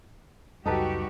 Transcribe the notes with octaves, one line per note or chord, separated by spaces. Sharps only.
C#2 F#2 G3 D#4 F#4 G4 A4 B4